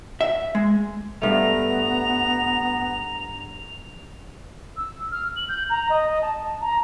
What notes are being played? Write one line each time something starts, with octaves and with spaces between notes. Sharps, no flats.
E5
G#3
G2 A3 B3 A#5 F7
E6
F6
F#7
G6
A#5
D#5
A5
A#5